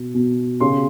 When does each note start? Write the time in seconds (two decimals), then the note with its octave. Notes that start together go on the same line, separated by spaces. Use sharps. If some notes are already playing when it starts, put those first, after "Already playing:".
Already playing: B2
0.14 B2
0.60 C#3 C6